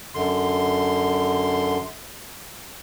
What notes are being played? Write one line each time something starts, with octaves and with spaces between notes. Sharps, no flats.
F#2 D3 C6